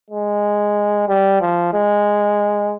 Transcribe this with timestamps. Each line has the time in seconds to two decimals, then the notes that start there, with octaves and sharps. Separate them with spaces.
0.10 G#3
1.08 G3
1.41 F3
1.74 G#3